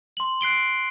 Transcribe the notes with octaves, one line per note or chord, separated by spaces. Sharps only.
C6 F#7
F#6 C7 D7 G7